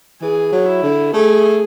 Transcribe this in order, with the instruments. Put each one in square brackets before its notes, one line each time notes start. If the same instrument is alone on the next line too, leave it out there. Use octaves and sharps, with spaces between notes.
[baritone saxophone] E3 [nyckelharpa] G#4
[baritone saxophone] F#3
[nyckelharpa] E4
[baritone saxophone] D3
[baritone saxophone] A3 [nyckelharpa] G#4